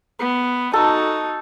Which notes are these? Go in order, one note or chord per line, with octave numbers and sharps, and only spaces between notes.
B3
D#4 F#4 A4